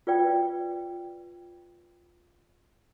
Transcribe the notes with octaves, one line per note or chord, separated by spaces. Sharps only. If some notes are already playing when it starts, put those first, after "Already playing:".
F4 B4 D5 G5